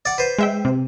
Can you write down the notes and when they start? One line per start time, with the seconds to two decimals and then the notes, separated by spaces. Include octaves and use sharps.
0.05 D5 F#5
0.18 B4 C5
0.39 G#3 E5 G5
0.65 C3